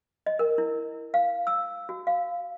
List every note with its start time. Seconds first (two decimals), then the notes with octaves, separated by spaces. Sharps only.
0.26 D#5
0.39 A#4
0.58 E4
1.14 F5
1.47 E6
1.89 F#4
2.07 F5